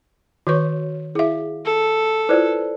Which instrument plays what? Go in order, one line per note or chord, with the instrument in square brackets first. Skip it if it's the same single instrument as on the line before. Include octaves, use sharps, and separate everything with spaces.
[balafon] D#3 B4 C#6 [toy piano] F#4 C#5
[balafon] E4 E5 [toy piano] G#4 F5
[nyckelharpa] A4
[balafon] E4 F4 [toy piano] B4 C5 D5